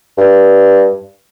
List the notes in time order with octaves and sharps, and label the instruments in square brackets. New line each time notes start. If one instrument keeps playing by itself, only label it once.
[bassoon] G2